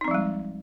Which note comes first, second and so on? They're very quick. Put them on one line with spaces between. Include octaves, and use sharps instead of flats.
D#4 C4 F3 G3 G#3